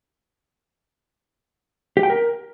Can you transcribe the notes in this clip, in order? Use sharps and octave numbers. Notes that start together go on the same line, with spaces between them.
G4
G5
A#4